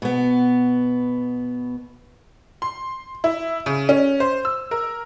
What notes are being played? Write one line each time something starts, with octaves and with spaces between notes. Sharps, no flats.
B2 B3
C6
E4
C#3
C#4
C5
E6
A#4